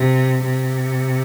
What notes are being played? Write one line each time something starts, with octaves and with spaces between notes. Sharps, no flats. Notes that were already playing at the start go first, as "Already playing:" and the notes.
Already playing: C3
C3